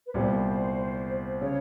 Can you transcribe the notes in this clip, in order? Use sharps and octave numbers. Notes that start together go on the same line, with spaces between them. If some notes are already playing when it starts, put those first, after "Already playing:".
B4
C2 A#2 G3 B3 C5
C#3 C#5